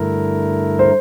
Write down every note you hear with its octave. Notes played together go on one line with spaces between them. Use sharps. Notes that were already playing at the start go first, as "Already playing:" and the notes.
Already playing: G2 D3 A3 E4 A#4
C5